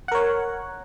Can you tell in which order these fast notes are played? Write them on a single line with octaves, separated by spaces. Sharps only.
F#5 A#4 C#5